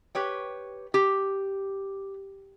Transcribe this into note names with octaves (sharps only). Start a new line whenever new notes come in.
G4 B4 C#5 G5
G4